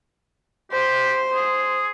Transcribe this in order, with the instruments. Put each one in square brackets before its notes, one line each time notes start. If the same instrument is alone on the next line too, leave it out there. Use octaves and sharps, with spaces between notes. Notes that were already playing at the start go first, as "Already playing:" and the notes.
[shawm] G4 [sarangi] C5
[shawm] G#4